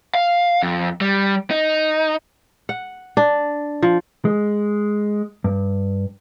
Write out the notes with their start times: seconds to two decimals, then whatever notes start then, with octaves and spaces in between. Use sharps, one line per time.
0.15 F5
0.63 F2
1.01 G3
1.51 D#4
2.69 F#5
3.17 D4
3.83 F3
4.25 G#3
5.44 G2